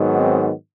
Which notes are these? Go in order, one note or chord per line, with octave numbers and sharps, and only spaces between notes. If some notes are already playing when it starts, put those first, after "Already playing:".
Already playing: G#2 D#3 F#3 B3
C4